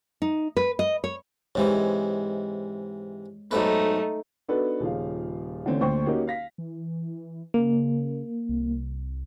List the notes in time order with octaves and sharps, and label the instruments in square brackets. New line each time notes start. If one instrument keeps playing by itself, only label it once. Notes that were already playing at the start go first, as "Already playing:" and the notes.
[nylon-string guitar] D#4
B4
D#5
C#5
[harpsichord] G#2 C3 E3 [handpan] G#3 C#5
[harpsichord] B1 G#2 B4 [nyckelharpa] A3 D#4
[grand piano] B3 D4 D#4 F#4 A4 B4
D#1 C#3 F3 F5
D3 E3 A3 C4 C#4
D2 A#2 D3 C5 G5 C#6
A#3 C#4 D#4 F#4 G4
F5 A#6 B6
[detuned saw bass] E3
[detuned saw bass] C#3 [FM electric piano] A#3
[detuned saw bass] C2